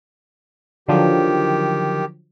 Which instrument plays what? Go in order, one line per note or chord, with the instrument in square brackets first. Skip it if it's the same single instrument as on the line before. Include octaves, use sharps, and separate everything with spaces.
[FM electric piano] D3 F3 F#3 [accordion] D#3 G4